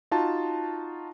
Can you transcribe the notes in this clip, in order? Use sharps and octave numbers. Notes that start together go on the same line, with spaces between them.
D#4 F4 F#4 A5